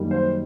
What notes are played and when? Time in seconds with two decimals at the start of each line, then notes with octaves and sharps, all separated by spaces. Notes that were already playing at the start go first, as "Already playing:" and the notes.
Already playing: F#2 D#3 G3 A#3
0.11 C5